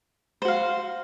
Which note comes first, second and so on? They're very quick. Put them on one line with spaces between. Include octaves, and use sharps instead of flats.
C5 F#4 F5